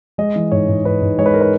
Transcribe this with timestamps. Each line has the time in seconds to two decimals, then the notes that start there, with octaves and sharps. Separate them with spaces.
0.18 G#3 D#5
0.36 E3
0.52 G#2 C#5
0.68 G#2
0.85 G#2 B4
1.02 G#2
1.18 G#3 C#5
1.26 B4
1.34 A#4
1.41 B4